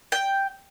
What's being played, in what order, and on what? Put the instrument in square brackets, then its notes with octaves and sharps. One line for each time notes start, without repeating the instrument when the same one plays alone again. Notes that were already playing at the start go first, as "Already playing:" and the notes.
[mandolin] G5